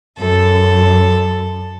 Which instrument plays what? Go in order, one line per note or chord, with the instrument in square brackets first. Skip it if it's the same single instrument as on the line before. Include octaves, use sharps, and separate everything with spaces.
[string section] F#2 [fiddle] A4